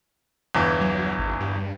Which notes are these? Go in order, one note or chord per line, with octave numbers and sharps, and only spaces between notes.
G1 E2 E3
F#3
G#1
G2